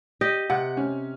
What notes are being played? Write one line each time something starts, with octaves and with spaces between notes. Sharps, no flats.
G4 D#5 G5
C3 F#5
C#4